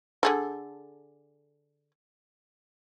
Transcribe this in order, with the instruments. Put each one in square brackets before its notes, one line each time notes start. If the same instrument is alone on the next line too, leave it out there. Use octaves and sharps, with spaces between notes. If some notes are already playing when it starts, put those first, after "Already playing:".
[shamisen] D3 G#4 A4